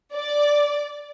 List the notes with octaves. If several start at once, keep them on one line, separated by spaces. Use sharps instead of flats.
D5